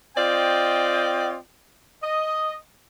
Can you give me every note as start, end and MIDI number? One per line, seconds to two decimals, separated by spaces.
0.17 1.36 60
0.17 1.36 65
0.17 1.36 74
0.17 1.36 75
0.17 1.36 79
2.03 2.55 75